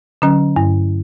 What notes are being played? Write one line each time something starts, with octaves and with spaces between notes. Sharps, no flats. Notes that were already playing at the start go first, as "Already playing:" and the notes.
D3 F#3 C#4
G2